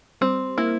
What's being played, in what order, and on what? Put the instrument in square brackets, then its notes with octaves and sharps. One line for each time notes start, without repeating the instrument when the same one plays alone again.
[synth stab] G3 [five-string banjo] C4
[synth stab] A#3 [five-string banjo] E4